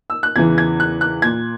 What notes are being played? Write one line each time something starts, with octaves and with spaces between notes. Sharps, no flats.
E6
F#6
E2 C#3 E3 G#6
G#6
F#6
F#6
A#2 G#6